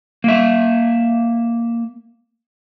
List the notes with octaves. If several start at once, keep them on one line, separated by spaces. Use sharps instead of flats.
A#3 E5